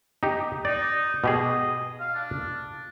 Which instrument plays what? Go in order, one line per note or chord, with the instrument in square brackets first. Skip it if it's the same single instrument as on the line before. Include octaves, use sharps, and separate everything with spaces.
[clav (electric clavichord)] D#4 G4
[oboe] D#4 [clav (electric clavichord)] D5
[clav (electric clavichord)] B2 G4 G#4 [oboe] D#5
[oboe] F5
D4